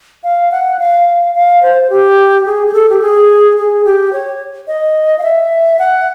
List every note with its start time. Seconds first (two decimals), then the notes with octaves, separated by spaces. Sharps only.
0.23 F5
0.51 F#5
0.79 F5
1.35 F5
1.62 C5
1.90 G4
2.46 G#4
2.67 G#4
2.73 A4
2.89 G4
3.01 G#4
3.57 G#4
3.85 G4
4.13 C#5
4.68 D#5
5.18 F5
5.23 E5
5.79 F#5